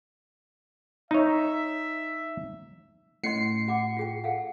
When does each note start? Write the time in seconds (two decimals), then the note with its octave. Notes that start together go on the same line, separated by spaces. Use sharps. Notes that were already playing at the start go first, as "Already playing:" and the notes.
1.11 D#4 C#5 E5
3.24 A2 C#4 D#5 C6 C7 C#7
3.68 F#4 F#5 D6
3.97 F4 G#4 G5
4.24 A4 F5 F#5